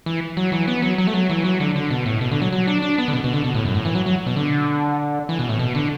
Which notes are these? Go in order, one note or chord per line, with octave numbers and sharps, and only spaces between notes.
E3
F#3
E3
B3
F#3
F#3
A3
F#3
E3
F#3
D3
D3
B2
A2
B2
D3
F#3
F#3
D4
D4
B3
D3
B2
B2
D3
B2
A2
F#2
A2
E3
F#3
F#3
B2
D3
E3
B2
A2
B2
D3